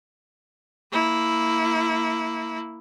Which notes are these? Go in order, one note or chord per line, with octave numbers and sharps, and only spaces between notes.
A#3 E4